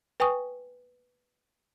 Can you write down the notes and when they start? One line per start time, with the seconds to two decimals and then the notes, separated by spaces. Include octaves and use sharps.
0.20 B4 G5 G#5 C#6 D#6